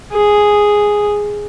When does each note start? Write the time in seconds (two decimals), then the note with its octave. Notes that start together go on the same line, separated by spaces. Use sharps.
0.13 G#4